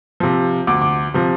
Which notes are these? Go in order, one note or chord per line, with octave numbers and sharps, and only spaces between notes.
C3 F3
D2 D6
D6
C3 F3